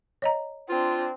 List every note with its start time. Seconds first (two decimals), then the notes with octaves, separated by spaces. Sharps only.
0.22 C#5 D#5 A#5
0.69 C4 D4 F4